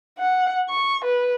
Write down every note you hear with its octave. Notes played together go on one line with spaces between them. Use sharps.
F#5
C#6
B4